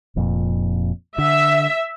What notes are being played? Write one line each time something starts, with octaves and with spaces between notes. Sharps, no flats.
F1 F2 A#2
D3 E5